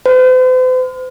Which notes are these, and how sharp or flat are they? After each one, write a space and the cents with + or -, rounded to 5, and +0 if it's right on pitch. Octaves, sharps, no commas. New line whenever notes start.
C5 -45